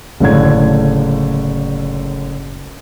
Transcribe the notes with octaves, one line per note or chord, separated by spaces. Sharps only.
F#1 A2 D3 G#6